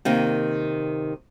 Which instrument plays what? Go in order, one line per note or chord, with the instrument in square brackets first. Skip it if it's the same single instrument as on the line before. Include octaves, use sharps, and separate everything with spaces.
[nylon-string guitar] C3 D#3 A#3